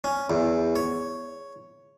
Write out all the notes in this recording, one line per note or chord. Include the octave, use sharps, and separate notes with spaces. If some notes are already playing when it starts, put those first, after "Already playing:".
C#4
E2
C#5